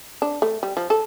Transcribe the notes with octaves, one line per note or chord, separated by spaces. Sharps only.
D4
A3
G3
F3
A4